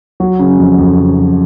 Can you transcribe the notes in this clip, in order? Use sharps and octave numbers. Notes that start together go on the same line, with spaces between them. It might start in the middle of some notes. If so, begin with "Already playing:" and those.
F#3
C#3
F2
F2
C#3
F#3